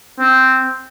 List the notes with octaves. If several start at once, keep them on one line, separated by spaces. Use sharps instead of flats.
C4